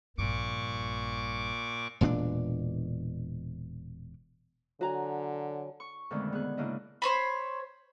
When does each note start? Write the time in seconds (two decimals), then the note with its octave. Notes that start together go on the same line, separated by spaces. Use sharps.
0.18 A#1 G2 A#2 C#6 D6
2.01 E1 A#2 C4 D4
4.81 D3 F#3 F#4 G#5 A#5
5.80 C#6
6.11 F2 B2 D3 D#3 G#3 A3
6.33 B3 G#4 F#6
6.57 G#2 C#3 A#3 D4 E4 D#5
7.02 C5 C#5 B5